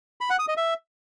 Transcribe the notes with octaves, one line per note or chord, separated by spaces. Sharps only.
B5
F#5
D#6
D#5
E5